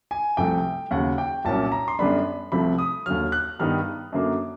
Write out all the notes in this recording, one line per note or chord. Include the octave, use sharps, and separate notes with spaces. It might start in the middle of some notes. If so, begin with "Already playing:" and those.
G#5
C2 C3 F3 A3 G5
D#2 C#3 F#3 F#5
G5
C2 A#2 F#3 A#3 C#4 A5
A#5
C6
F#2 D3 G3 B3 D4 B5
C2 C3 F3 A3 B5
D#6
D#2 D3 F#3 F6
F#6
G2 D#3 G3 B3 D#4 F6
F#2 D3 F#3 A#3